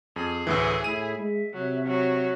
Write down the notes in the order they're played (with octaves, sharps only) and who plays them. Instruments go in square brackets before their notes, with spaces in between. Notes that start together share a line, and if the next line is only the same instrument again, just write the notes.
[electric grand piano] F2 [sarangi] G#4
[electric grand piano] D2 A2 E3 [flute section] E6
[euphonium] A2 [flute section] E4 E5 [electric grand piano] D#7
[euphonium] G#3 [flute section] E5
[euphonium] C3 [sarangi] F#3
[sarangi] F#3